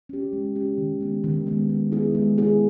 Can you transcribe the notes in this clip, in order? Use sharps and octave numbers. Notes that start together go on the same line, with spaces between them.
C#4 G4
G#3
C#4 G4
D#3
G#3 B3
D#3
G#3 B3
G#3
B3 E4 G#4
G#3
B3 E4 G#4